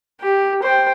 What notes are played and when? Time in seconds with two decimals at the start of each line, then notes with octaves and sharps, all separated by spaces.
0.21 G4
0.63 C5 G5